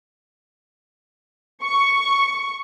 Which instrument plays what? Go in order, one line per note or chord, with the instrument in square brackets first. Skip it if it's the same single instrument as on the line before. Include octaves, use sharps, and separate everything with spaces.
[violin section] C#6